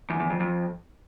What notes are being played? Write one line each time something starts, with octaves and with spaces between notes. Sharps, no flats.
E2
E2
F2
F2